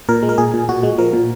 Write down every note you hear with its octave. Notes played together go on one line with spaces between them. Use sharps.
A#2 A#4
G#3
A#4
A#2 G#4
A#2
A#2 F#4
G#3
F3 A#4
A#2